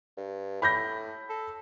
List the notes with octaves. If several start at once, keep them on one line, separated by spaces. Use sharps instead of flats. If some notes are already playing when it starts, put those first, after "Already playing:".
G2
A2 B5 G6 A#6
A4